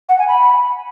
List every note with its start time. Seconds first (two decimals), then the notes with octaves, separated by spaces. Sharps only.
0.09 F#5
0.19 G#5
0.28 B5